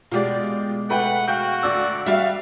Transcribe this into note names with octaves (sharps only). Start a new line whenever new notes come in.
B2 G#3 F4 G4 D5
A3 B4 F#5 G5
F#4 F5 G5 G6
D2 D5 E6
G3 F#4 E5 F5